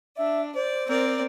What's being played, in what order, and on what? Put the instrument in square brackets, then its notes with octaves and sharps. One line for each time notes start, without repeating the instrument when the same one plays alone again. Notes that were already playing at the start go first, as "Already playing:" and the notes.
[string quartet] D4 [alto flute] E5
[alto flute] C5 [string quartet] D5
[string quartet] C4 A#4 D5